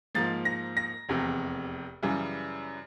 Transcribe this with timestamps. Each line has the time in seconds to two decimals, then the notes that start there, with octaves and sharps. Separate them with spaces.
0.15 G#2 F3 A#3 A6
0.45 A#6
0.77 A#6
1.09 F1 E2 C3
2.03 F#2 C#3 E3 G3